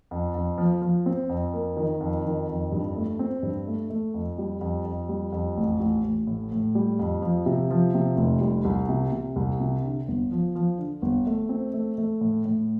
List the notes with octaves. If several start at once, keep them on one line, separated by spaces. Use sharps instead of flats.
F2
F2
F3
F3
C4
F2
A#3
D#3
F2
D#3
F2
G2
A3
C4
G2
A3
A3
F2
G3
F2
F2
G3
F2
A1
A1
A1
A2
A2
G3
F2
F3
C3
F3
C3
F1
G3
C2
C3
C3
C2
C3
D3
G1
F3
F3
D3
G1
A3
C4
A3
A3
A2
A2